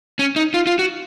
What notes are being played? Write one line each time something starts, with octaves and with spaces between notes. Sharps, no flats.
C#4
D#4
F4
F4
F#4